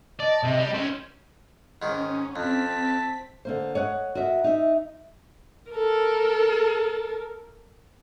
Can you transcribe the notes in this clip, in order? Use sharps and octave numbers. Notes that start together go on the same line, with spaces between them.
D5 D#5 A5
C3
G3
C#4 C5
G#2 D#3 C#4
F2 C4 A5 B6
D3 A#3 C5
C#5 D#5 F#5
F#4 A#4 D#5 E5
D#4 E5
A4 A#4